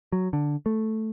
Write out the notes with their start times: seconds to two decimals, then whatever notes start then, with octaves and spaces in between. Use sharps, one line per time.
0.12 F#3
0.33 D3
0.66 A3